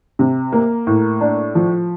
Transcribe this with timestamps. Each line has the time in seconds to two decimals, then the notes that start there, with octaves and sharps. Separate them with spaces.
0.19 C3
0.53 A#3
0.87 A2
1.21 D4
1.55 F3